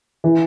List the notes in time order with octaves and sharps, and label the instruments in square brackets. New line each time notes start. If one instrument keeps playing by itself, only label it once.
[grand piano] E3